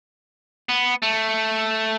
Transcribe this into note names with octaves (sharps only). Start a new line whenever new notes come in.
B3
A3